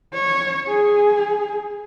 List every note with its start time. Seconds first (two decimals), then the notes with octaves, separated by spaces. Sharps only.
0.14 C#5
0.68 G#4